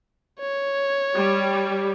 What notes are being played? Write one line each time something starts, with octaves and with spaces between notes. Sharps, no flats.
C#5
G3 G4